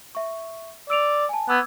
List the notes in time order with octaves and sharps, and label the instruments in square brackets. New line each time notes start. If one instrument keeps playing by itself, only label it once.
[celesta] E5 C#6
[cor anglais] D5 [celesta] E6 D7 F7
[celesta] G#5 A5
[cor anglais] B3 [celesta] D6 E6 G#6